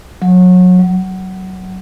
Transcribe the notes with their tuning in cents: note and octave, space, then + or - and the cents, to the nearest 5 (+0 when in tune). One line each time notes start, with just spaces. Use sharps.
F#3 -30
F#3 +20